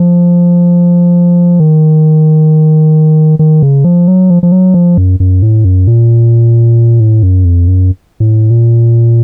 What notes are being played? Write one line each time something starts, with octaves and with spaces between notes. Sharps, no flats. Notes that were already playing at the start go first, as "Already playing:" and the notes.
Already playing: F3
D#3
D#3
C#3
F3
F#3
F3
F3
F#3
F3
F#2
F#2
A2
F#2
A#2
A2
F#2
F2
F#2
A2
A#2